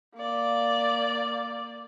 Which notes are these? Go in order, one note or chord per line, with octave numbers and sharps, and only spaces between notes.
A#3 D5